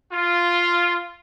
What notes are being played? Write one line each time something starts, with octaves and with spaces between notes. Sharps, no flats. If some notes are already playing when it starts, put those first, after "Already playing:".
F4